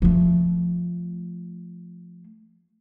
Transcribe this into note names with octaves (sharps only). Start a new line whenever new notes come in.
F3 A3